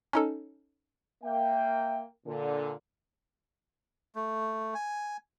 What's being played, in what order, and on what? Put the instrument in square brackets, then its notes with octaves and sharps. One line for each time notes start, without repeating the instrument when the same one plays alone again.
[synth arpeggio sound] C#4 D#4 A4
[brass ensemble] A#3 E5 G5
A#2 D3
[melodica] A3
G#5